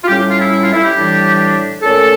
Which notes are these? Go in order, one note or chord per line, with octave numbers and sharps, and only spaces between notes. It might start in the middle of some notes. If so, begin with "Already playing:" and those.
F4
A2 G3 C#4 G4
F4
E4
E4
F4
E4
G4
A2 E3 G3 D4
A#2 A3 C#4 A4